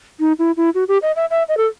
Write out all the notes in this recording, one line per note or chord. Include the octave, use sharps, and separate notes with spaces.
D#4
E4
E4
F#4
G4
D#5
E5
E5
D#5
A4